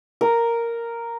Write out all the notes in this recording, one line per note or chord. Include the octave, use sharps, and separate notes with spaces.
A#4